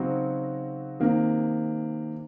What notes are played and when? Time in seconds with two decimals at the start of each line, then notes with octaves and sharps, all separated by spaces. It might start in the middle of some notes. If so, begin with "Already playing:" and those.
Already playing: C#3 F#3 C4 D#4 F#4
1.00 C3 D#3 A#3